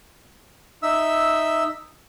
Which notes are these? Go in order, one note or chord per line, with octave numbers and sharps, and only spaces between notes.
D#4 E5 E6